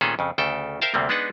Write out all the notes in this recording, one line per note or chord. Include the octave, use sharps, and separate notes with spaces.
A#2 D#3 B3 C#4 G#4 A4
F2 C#3
D2 C#3 A4 G5
A#4 C5 E5 F5 G5 A5
D2 C3 G3 A#3 C4
G#3 B3 D4 D#4 B4 F#5